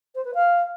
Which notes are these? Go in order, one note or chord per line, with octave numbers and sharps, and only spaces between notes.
C5
B4
F5